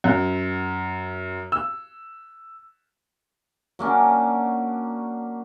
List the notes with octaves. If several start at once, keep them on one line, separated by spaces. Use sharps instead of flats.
F#2
E6
F#3 A#3 C#4 D4